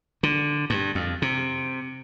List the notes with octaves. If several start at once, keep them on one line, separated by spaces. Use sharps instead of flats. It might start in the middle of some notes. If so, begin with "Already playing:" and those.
D3
G2
F2
C3